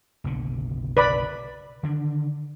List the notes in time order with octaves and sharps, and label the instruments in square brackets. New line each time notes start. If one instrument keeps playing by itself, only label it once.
[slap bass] F#1 B1 D3
[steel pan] B4 D5 B5
[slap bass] D3 D#3 D4